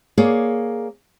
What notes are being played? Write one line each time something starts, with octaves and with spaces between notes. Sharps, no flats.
A#3 G#4 C#5 D5